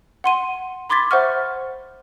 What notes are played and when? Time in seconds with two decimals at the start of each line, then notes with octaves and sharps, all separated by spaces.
0.24 F#5 C6 D#7
0.90 B5 C6 D6 G#6 A6 B6
1.11 C5 E5 F#5 C#6 F6